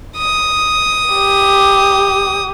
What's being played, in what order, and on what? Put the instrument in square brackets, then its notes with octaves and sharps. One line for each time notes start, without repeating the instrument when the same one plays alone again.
[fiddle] D#6
[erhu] G4